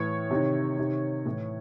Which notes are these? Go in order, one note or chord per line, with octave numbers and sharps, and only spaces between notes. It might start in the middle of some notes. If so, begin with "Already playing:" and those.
Already playing: A2 E3 C#5
C3 D#3
C3 D#3
A2 E3